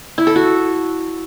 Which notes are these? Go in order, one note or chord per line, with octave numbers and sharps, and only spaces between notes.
E4
A4
F#4